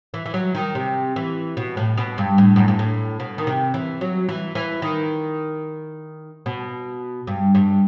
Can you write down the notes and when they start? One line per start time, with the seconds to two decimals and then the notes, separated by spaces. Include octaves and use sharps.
0.14 E3
0.26 E3
0.34 F#3
0.55 D#3
0.75 C3
1.16 E3
1.57 B2
1.77 A2
1.97 B2
2.18 G2
2.38 A2
2.56 F#2
2.68 G2
2.79 A2
3.20 B2
3.38 D#3
3.47 C3
3.74 E3
4.01 F#3
4.29 E3
4.55 E3
4.82 D#3
6.46 B2
7.27 G2
7.55 G2